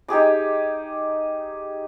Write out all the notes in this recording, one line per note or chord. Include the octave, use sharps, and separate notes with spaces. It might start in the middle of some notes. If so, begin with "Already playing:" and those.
D#4 G4 G#4 D6